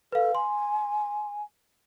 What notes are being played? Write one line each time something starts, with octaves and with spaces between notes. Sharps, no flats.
A4 B4 F5
G#5 C6